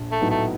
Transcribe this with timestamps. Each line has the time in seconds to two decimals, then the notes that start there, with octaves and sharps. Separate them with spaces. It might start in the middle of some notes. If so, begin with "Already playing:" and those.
Already playing: A#1
0.12 A3
0.21 A2 F#3 B3 D#4
0.30 A3